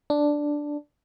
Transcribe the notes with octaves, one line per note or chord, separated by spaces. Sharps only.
D4